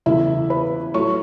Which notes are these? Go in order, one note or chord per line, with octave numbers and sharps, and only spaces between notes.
E2 C#3 E3 A3 E4 E5
B4 B5
A2 F#3 A3 C#5 C#6